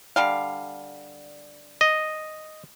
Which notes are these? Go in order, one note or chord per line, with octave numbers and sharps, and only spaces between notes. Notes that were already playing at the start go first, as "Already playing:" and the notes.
D3 G3 F5
D#5